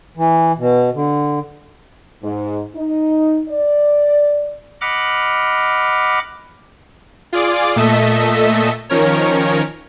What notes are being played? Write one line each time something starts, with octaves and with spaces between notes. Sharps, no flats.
E3
B2
D3
G#2
D#4
D5
D#5 F#5 B5 D6 F6
F4 G#4 D5 D6
A#2 A3 A4 D#5 E5 B6
D#3 F3 C#4 A#4 C#5